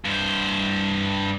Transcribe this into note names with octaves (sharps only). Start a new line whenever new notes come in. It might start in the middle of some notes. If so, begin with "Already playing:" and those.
G2 C5